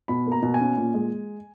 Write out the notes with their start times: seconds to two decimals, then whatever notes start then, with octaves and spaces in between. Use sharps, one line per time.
0.08 B2 B5
0.26 A#3
0.32 A#5
0.43 B2
0.54 G#5
0.61 C#4
0.77 A#2
0.94 G#3